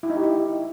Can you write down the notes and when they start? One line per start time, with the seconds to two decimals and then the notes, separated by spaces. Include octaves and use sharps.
0.03 E4
0.10 D#4
0.17 G4
0.23 E4